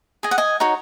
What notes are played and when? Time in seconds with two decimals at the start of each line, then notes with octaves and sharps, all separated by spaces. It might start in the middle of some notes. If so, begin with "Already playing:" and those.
0.23 G#4 D#5 G#5
0.31 F#5
0.38 D#5 G#5
0.60 D#4 F#4 C#5